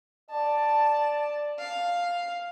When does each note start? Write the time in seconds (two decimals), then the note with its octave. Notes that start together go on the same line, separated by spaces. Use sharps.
0.30 D5 A5
1.59 F5